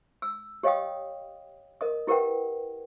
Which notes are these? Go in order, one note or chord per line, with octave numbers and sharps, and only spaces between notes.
E6
G4 C#5 D#5 F5 G5 D#6
A#4 D#5 D#6
E4 G4 A#4 B4 F#5 G5